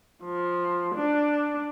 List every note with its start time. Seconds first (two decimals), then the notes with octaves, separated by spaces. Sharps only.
0.23 F3
0.95 D4